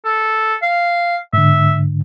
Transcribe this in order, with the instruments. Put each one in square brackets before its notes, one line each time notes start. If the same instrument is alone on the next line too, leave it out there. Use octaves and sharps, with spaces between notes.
[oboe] A4
F5
[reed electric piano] G#2 D3 [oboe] E5